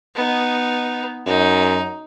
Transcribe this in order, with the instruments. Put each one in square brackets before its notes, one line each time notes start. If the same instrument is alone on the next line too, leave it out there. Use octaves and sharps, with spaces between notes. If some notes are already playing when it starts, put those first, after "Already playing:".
[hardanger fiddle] B3 D#4
[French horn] F#2 [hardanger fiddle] D#4